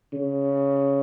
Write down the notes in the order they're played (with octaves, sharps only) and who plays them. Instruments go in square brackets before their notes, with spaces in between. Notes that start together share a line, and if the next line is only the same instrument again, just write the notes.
[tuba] C#3